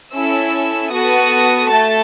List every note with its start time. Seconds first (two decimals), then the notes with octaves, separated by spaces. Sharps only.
0.13 C#4 E4 A4 E6
0.92 B3 F#4 A4 D#6
1.71 A3 A5